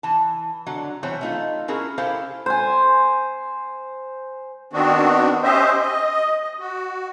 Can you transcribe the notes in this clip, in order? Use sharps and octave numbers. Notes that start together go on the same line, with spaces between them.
E3 A5
D3 F#3
B2 E3 G3 C5 C#5
A3 D#4 F4
C#4 E4 F#4 G#4 A#4
C#4 E4 G4 A4 C5 F5
C5 G#5
D#3 B3 C4 D4 F#4
C#4 G4 C5 D#5 E5
D#5
F#4